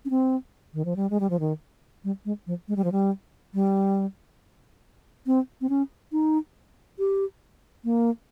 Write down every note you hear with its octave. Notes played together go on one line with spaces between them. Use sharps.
C#4
C4
D#3
F3
G3
G#3
G3
F3
D#3
G3
G#3
F3
G#3
G3
F3
G3
G3
C4
C4
C#4
D#4
G4
A#3